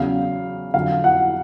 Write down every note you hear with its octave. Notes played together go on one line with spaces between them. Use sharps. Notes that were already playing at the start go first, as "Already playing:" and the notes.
Already playing: E2 C#3 F#3 F5
F2 D3 F#3 F5
F#5